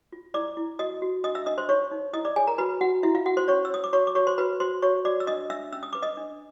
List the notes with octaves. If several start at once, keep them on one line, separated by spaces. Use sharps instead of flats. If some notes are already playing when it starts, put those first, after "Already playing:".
F4
E4 D5 D6
E4
F#4 D#5 D#6
F#4
D4 D#5 D#6
E5 E6
D4 D#5 D#6
C5 C6
D#4 C#5 C#6
D#4
E4 D#5 D#6
D5 D6
G#4 C#5 G#5
A#4 A#5
F#4 B4 B5
F#4 F#5
E4 F#4 E5
F4 F5
F#4 F#5
C5 C6
C#4 C#5 C#6
E6
C#5 D#6
D6
F#4 C#5 C#6
D6
F#4 C#5 C#6
C5 C6
F#4 B4 B5
F#4 C5 C6
F#4 C#5 C#6
F#4 D5 D6
E6
D4 D#5 D#6
D4 E5 E6
C#4 E6
D#6
B4 D6
D#5 D#6
D4